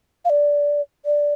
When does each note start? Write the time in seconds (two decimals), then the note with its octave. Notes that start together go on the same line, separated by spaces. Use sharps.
0.25 F5
0.30 D5
1.05 D5